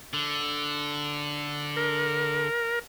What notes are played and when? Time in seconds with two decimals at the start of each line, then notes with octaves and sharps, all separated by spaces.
0.13 D3
1.76 A#4